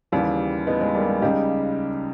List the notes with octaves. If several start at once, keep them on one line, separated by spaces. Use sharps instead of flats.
D#2 C#3 E3 G3
B3 D#4
G#3 B3
G3 A#3
G#3
C#2 C#3 G3 D#4 G4